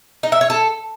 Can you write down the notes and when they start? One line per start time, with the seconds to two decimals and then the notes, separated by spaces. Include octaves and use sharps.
0.23 D#4
0.32 E5
0.41 C#5
0.50 A4